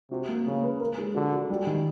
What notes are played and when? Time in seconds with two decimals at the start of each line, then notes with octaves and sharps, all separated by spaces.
0.11 C3 F#4
0.28 A#3
0.46 C#3 A#3
0.63 B4
0.80 A#4
0.98 G#3
1.14 D3 F#4
1.32 F#4
1.50 G3
1.67 D#3